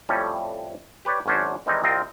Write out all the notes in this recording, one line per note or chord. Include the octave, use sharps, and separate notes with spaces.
F2 A2 G3 C#4
G4 B4 C#5 D5
G#1 F#2 C#4 D4 C5
D#3 E3 G3 G#3 C4 D#4
C2 C4 F4 A#4 D#5